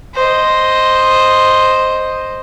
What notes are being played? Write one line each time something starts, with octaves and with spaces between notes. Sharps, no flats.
C5 D#5